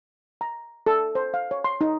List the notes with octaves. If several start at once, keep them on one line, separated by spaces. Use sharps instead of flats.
A#5
A4
C5
F5
C#5
C6
D#4